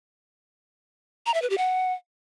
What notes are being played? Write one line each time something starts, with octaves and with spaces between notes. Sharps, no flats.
A#5
E5
B4
G4
F#5